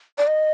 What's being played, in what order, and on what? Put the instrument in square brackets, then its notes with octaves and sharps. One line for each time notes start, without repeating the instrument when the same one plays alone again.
[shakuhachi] D5
D#5